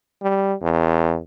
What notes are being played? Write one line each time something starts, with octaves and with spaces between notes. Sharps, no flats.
G3
E2